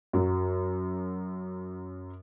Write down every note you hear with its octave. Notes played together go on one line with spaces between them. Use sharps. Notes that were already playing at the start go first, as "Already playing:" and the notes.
F#2 F#3